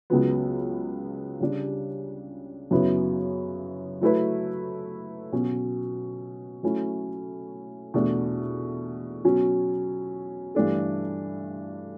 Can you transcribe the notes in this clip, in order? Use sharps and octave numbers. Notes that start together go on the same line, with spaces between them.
C#2 C#3 F#3 B3
C#3 G3 D4
F#2 C#3 F#3 B3 E4
F#3 A3 E4 B4
B2 F#3 C#4
F#3 A3 C#4 E4
E2 B2 A3 D4
B2 F#3 C#4
G2 E3 A3 D4 A4